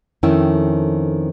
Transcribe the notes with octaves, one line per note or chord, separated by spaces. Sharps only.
F2 D#3 A3 C#4 E4 G5